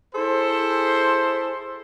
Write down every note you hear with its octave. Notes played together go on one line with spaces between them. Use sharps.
E4 G#4 A4 C5